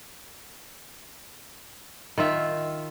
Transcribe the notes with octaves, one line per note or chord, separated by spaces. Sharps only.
D#3 F4 E5